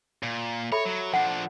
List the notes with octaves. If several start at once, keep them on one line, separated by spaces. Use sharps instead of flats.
A#2
A4 C#5 E5 B5
F#3
F3 D4 F#5